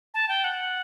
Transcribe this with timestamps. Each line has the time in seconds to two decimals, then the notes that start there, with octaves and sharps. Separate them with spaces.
0.14 A5
0.28 G5
0.44 F#5